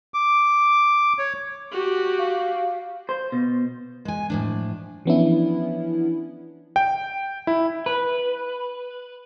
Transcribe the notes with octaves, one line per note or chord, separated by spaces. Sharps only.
D6
C#5
F#4 G4
F5
C5
B2
G#3 G#5
A2 F3 D4
E3 F3 B3 C#4 D4 E4
G5
E4
B4